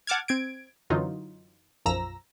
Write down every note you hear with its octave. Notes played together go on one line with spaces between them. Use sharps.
F#5 A5 D6 F6 G#6
C4 G#6 D7
F#2 D3 E3 F#3 D#4 F4
B1 F#2 F3 A#5 E6 A#6